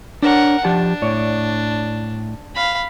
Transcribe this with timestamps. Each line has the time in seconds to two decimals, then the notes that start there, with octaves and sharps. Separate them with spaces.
0.22 D4 A#4 C#5 F#5
0.65 F3 D4 G4 A5
1.02 A2 C#5 D5
2.55 F5 B5